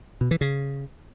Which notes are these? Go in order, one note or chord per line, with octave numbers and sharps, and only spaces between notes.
B2
E3
C#3